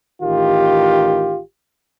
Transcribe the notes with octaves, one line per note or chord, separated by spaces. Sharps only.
A1 D#3 F4 G4